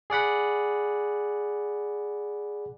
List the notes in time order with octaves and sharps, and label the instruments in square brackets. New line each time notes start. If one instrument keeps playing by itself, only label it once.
[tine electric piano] G#4 D5 F#5 B5